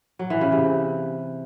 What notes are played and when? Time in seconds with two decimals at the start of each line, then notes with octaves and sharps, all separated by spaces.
0.19 F#3
0.30 E3
0.41 C#3
0.52 C3